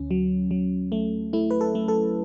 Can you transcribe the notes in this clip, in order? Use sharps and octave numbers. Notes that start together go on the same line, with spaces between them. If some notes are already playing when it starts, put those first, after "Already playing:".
Already playing: D2 C#4
F#3
F#3
A3
A3 E4
B4
A4
A3
A4